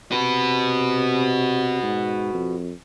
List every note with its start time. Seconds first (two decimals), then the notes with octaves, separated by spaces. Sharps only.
0.12 C3 F#4 B4
1.83 G#2
2.34 F2